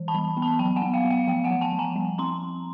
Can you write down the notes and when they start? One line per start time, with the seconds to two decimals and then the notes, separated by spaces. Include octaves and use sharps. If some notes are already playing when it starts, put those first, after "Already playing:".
Already playing: E3
0.08 A5 B5
0.14 G3
0.37 B3
0.42 A5 B5
0.59 F#3 G5 A5
0.76 F#5 G#5
0.82 B3
0.94 F5 G5
1.05 B3
1.10 F5 G5
1.28 F3 F5 G5
1.44 F#5 G#5
1.51 F3
1.61 G5 A5
1.73 F3
1.79 G#5 A#5
1.96 G3
2.18 C4 A#5 C6